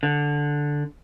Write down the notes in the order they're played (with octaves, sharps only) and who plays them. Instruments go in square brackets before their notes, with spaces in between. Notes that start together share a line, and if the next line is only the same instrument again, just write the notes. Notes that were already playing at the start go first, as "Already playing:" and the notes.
[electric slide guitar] D3